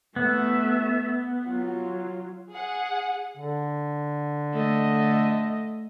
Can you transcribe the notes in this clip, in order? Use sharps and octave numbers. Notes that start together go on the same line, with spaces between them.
A3 B3 E5
F#3 F4
G#4 F#5
D3
A3 D#5